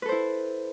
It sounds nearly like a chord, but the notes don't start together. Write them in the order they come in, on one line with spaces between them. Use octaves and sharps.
B4 A4 C5 E4